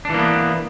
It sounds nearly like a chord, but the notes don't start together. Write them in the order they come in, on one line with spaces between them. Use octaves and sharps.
D4 E3 A#3 B3